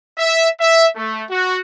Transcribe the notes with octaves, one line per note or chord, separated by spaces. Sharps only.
E5
E5
A3
F#4